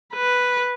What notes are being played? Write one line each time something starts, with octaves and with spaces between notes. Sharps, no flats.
B4